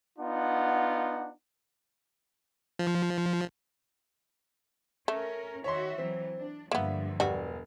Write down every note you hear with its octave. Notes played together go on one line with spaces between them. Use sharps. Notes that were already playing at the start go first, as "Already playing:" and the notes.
B3 D4 D#4 F4 F#5
F3
A3 C#4 A#4
D#3 F#4 C#5 E5 C6
E3 F#3 C4
D4
G2 D3 F3 A#3 B3 E5
E1 G3 B3 F#4